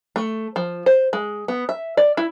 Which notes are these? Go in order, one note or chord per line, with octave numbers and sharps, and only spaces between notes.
A3
F3
C5
G#3
B3
E5
D5
E4